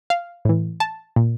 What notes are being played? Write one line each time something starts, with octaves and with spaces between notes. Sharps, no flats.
F5
A2 E3
A5
A#2